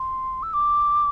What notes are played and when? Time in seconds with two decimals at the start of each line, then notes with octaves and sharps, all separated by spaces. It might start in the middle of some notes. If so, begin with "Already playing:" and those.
Already playing: C6
0.43 E6
0.54 D6